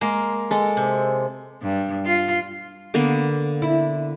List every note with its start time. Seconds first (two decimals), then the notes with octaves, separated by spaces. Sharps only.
0.01 G#3 A#3
0.51 G#3 A4
0.77 C3
1.62 G2
2.06 F4
2.94 D3 A#3 B3
3.62 E4